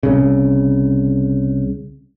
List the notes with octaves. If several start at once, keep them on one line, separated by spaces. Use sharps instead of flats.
C2 C#3